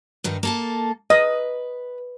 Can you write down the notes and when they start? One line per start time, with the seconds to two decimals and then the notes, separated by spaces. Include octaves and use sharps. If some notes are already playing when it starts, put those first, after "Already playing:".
0.24 G2 D#3 D#4
0.43 A#3 A4 A5
1.10 B4 D#5